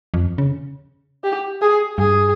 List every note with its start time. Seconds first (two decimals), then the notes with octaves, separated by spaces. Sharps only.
0.14 F2
0.38 C#3
1.24 G4
1.61 G#4
1.98 G2 G#4